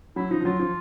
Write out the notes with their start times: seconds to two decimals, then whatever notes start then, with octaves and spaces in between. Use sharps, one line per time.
0.16 F#3 E4
0.31 F3 D#4
0.41 F3
0.45 F#3 F4
0.60 F3